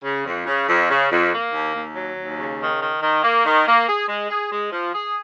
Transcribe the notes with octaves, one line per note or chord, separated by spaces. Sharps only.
C#3
F2
C#3
F2
C#3
F2
A#3
D#2
D#2
F#3
D#2
C#3
D#3
D#3
D#3
A#3
D#3
A#3
G#4
G#3
G#4
G#3
F3
G#4